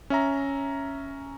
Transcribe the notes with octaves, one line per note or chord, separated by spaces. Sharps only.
C#4 E5 A#5